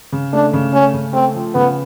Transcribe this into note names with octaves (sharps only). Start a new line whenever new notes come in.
C#3
A3 D4
C#3
A3 C#4
C#3
A3 C4
F3
C#3 B3